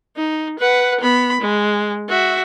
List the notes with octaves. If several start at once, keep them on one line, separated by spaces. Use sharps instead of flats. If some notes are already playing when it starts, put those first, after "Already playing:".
D#4
B4 F#5
B3 B5
G#3
F#4 E5